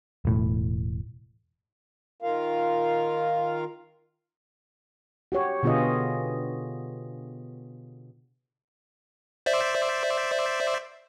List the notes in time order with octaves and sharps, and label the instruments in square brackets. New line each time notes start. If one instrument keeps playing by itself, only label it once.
[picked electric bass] E1 A2
[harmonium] D#3 F4 A#4 F5
[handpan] F#4 G4 C#5
B2 D3 B3 F4 G#4 D#5
[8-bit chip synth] C5 D5 E5